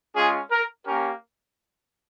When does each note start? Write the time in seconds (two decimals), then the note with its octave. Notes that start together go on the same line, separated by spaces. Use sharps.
0.16 G#3 C#4 F4 G#4
0.51 A#4
0.87 A#3 C#4 G4 A#4